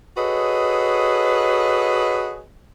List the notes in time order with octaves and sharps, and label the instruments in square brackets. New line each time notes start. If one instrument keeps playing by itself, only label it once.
[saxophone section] F#4 G#4 A4 B4 C#5 D#5